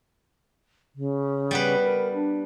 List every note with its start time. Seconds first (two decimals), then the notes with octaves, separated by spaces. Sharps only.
0.95 C#3
1.51 G3 B3 B4
1.82 A#4
2.14 D4